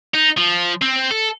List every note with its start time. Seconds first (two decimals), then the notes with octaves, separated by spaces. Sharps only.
0.14 D#4
0.38 F3
0.82 C4
1.11 A4